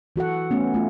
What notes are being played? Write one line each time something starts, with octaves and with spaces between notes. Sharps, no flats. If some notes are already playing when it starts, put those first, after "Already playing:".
E3 F#4 A4 F#5
A3 B3 C#4
A3 F4